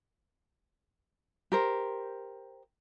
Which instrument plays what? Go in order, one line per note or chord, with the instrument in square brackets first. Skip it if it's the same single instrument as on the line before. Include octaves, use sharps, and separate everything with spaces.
[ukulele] G4 A#4 C5